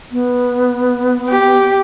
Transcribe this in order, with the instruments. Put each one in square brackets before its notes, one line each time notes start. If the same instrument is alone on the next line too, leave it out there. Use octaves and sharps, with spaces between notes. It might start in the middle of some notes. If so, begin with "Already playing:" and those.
[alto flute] B3
[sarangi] G4